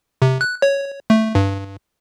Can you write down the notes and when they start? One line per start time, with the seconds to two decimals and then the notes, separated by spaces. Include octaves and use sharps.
0.22 C3
0.41 F#6
0.62 C#5
1.10 A3
1.35 G2